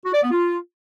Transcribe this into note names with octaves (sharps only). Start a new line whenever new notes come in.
F#4
D5
B3
F4